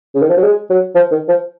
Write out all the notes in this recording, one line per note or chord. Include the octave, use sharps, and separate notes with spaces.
C#3
D#3
F3
F#3
G#3
F#3
F3
D#3
F3